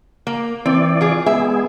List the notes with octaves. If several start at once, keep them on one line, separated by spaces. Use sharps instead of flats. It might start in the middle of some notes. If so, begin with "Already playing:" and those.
A#3
E3 C4 D5
F4 G#4
G#3 B3 G#4 E5